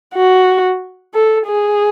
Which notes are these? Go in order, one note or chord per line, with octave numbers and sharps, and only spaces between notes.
F#4
A4
G#4